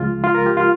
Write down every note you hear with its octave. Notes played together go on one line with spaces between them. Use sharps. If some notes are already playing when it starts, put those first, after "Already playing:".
Already playing: C#2 C#3 F3 G#3 F4
F4
A#4
G4
F4